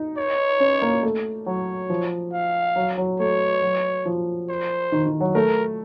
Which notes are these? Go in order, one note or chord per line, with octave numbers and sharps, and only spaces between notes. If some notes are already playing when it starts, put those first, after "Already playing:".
Already playing: D#4
C#5
C#4
A#3
A3
F#3 C#5
F3
F5
F#3
F#3
A3 C#5
F#3
F3
C5
D#3
D#3
F#3
A3 A#4